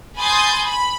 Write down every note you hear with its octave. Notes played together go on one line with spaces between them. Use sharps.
G#5 B5 C6 D#6 G6 A6
B5